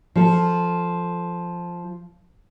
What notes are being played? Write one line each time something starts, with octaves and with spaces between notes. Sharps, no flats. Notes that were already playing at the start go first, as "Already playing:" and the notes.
F3 A4